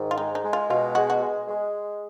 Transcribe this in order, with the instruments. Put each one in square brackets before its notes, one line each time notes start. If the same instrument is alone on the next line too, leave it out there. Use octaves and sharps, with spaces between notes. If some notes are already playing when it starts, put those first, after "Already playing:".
Already playing: [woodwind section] G#2 D#3
[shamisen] F4
[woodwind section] G#3 [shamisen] D#4
[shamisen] D#4
[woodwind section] G#3
[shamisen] F4
[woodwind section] B2 [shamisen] F4
[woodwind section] G#3 [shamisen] F#4
[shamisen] F#4
[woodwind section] G#3
G#3